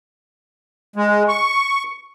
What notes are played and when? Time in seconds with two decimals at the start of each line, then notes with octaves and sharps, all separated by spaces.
0.96 G#3
1.28 C#6